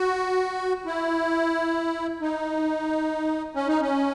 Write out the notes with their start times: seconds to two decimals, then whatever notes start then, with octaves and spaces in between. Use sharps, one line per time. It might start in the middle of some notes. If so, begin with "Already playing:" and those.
Already playing: F#4
0.86 E4
2.21 D#4
3.55 C#4
3.68 D#4
3.81 C#4